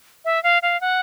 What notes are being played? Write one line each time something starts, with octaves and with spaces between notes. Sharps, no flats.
E5
F5
F5
F#5